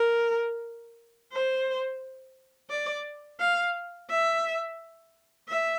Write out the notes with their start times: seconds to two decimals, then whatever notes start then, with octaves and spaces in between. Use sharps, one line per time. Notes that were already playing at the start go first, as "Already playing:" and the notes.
Already playing: A#4
1.33 C5
2.70 D5
3.40 F5
4.10 E5
5.48 E5